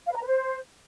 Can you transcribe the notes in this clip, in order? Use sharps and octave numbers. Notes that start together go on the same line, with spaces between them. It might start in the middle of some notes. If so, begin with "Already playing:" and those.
F5
B4
A#5
B4
C5